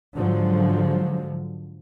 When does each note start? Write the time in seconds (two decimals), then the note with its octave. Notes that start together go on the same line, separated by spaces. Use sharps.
0.15 G#2 D3 F3 F#3